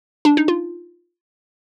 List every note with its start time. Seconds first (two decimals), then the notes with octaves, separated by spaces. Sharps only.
0.25 D4
0.37 D#4
0.48 F4